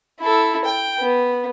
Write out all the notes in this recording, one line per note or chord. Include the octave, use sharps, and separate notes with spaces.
E4 A4
G5
B3